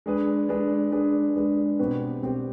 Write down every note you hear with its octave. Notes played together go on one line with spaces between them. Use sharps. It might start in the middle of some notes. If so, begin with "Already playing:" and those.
G#3 D4 G#4 B4
G#3 D4 G#4 B4
G#3 D4 G#4 B4
G#3 D4 G#4 B4
B2 G3 C4 G4 B4
B2 G3 C4 G4 B4